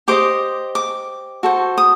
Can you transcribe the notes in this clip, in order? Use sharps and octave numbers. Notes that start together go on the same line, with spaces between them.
G4 C5 D#5 D6
D6
F#4 A4 C5
D#6